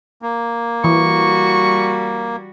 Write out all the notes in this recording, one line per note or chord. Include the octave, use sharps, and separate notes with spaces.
A#3
E3 G3 F#4 C#6